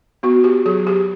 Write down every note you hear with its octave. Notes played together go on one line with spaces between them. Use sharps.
B3 F#4
G4
F#3 G#4
G4